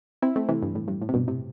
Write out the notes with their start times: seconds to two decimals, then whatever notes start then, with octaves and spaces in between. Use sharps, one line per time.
0.22 C4 E4
0.36 A3 C4
0.49 C3 E3
0.62 G2
0.75 A2
0.88 G2
1.02 A2
1.09 C3
1.14 G2 B2
1.27 A2 C3